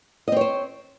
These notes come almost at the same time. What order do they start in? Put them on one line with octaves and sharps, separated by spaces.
D#5 C4 C#5 C5